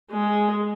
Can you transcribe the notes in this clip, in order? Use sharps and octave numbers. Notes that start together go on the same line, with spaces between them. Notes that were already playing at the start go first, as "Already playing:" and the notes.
G#3